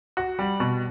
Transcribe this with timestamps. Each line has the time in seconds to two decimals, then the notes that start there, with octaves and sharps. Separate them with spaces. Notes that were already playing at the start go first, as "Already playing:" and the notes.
0.17 F#4
0.39 G3
0.60 B2